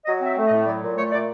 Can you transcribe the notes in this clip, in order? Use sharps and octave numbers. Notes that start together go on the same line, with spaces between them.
F#3 D#5
C4 E5
A3
D#5
A2
F#3 D5
A#2
A3 C#5
A#2 D5